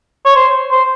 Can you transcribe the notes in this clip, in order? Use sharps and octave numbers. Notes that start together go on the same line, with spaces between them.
C#5
C5
C5